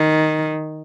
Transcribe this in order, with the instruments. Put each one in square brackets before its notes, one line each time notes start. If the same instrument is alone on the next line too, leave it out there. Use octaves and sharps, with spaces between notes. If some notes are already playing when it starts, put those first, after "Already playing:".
Already playing: [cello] D#3